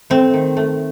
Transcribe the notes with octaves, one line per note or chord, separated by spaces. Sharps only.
A3 C4
D#3
A3